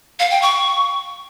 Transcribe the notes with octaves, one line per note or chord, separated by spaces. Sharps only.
F5
G5
C#6